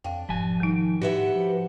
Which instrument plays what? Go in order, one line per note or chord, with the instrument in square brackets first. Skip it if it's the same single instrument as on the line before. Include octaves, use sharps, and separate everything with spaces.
[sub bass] F2 [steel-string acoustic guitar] D4 [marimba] F5 G5
[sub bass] E1 [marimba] G#2 [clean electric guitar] F3 G#5
[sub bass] D#3 [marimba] G3 D#4
[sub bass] A2 [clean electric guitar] F#4 E5 [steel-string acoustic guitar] G4 B4 F#5
[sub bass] F3